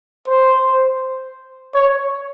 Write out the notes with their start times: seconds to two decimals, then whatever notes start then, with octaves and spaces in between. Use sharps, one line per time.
0.27 C5
1.74 C#5